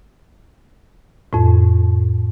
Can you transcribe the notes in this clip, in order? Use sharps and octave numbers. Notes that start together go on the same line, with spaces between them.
F2 A2